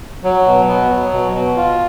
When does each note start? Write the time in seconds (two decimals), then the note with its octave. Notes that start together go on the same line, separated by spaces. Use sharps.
0.24 F#3
0.46 B2
0.68 B3
0.90 F#3
1.13 B2
1.34 B2
1.57 F4